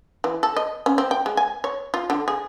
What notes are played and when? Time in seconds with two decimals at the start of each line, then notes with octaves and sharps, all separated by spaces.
0.24 E3
0.43 A4
0.57 D#5
0.86 C#4
0.98 C4
1.11 G5
1.26 G#3
1.37 G#5
1.64 C#5
1.94 F4
2.10 D3
2.28 G#4